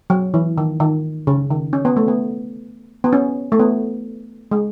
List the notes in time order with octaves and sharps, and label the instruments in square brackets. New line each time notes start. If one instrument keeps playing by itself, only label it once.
[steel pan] F#3
E3
D#3
D#3
C#3
D#3
C#4
B3
A3
B3
B3
C#4
A3
B3
G#3